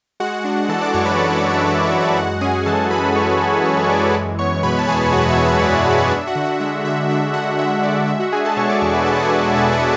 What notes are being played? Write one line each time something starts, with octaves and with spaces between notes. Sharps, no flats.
G#3 F#4 F#5
D4
E3 A4 A5
D5 D6
F#2 C#5 C#6
B4 B5
G#3 A4 A5
D5
D4
E5
E3 E5
E5
F#2
F#4 F#5
G#3 F#4 F#5
C#4 G#4 G#5
E3 A4 A5
F#2 B4 B5
G#3 C#5 C#6
C#4
E3 C#5 C#6
C#5 C#6
F#2 D5 D6
C#5 C#6
G#3
B3 C#5 C#6
B2 B4 B5
A5
E2 G#4 G#5
G#3 F#4 F#5
E5
B3
E5
B2 D5
E2
D4 E5
F#4 F#5
D3
F#4 F#5
G#3 E5
D3 E5
D4 E5
D3 F#4 F#5
G#3 E5
D3 D5
G#3 E5
F#4 F#5
D4 G#4 G#5
A4 A5
B2 C#5 C#6
D5 D6
E2 C#5 C#6
B4 B5
G#3 A4 A5
F#5
G#4 G#5
D4
B2 E5
F#4 F#5